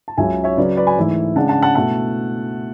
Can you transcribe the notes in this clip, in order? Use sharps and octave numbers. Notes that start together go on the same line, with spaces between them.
A5
C#2 C#3 F#3 C#4 E5 G#5
C#5 E5
C#3 F#3 C#4 B4 D5
B4 D5
G#5 B5
G#2 E3 A3 E4
C#3 G#3 D4 F#5 A5
F#5 A5
F#5 A5
B2 A3 E4 F#5 A5